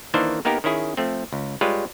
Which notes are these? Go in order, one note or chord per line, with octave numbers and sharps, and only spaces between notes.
D#3 E3 A#3 D4 D#4 C5
A#3 B3 D#4 G4 A#4
D#3 C#4 E4 G#4
F3 A3 C4
C#2
G3 G#3 F4 B4 C#5